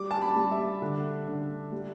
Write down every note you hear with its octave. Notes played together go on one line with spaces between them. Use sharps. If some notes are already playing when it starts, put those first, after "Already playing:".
Already playing: G3 D6
A5
B5
G3
E5
D3
D3
G3